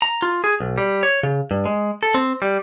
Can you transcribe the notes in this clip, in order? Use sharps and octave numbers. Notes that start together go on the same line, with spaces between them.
A#5
F4
G#4
B1
G3
C#5
C#3
G2
G#3
A4
C4
G3